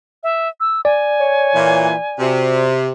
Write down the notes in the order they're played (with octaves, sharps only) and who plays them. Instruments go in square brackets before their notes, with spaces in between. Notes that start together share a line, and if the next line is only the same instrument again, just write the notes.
[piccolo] E5
E6
[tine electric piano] D5 [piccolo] G#5
[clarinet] C#5
[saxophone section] A#2 E3
[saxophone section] C3 [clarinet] F#4